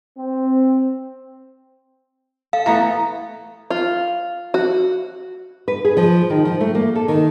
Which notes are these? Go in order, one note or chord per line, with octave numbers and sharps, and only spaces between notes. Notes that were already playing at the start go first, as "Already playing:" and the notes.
C4
A4 F5
E3 A3 B3 A#5
F4
F#4
B4
G#4
F3
D#3
F3
A3
A#3
A4
D#3